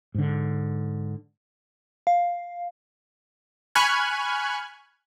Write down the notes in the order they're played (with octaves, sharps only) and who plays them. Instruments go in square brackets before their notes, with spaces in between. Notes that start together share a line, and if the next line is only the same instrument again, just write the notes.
[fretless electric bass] G#2 D3
[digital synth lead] F5
[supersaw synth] G#5 B5 C#6 F6 F#6 G#6